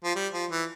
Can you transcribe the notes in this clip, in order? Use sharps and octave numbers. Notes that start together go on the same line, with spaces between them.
F3
G3
F3
E3